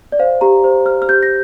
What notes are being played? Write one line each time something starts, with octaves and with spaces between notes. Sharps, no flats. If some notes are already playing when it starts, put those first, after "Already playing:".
D5
C5 F5
G4 A#5
C5
C5 F6
F6
G4 G6
A#6